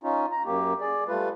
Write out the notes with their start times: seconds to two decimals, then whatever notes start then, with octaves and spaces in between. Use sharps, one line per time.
0.04 C#4 D#4 F4
0.32 A#5
0.45 F#2 A#3 G4
0.81 G#4 D5
1.08 G3 A3 F4 B4